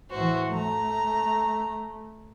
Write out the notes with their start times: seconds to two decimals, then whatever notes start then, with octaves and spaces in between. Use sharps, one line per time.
0.11 A2 E3 F#4 C5
0.54 A3 A#5